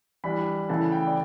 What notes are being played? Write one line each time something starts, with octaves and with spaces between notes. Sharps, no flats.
E3 G3 D4 B5
C#3 E3 A3 E4 A5
G5
D5